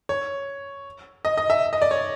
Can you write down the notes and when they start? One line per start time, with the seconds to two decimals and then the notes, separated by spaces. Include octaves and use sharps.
0.09 C#5
1.25 D#5
1.37 D#5
1.50 E5
1.73 D#5
1.82 D5
1.91 C#5